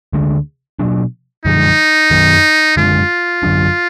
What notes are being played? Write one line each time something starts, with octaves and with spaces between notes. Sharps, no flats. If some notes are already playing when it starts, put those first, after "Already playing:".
D2 D3 G#3 D4
B2 F#3 D4
F#2 D3 F3 G#3 D#4
F#2 D#3 F#3 B3
F#2 D3 G#3 D4 F4
F#2 D3 F#3 D4